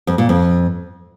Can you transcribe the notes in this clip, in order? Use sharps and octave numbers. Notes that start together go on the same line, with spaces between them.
F2
A#2
F2